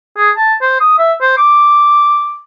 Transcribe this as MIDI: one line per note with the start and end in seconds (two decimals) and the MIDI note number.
0.17 0.31 68
0.37 0.54 81
0.62 0.75 72
0.81 0.97 87
0.99 1.13 76
1.21 1.38 72
1.38 2.40 86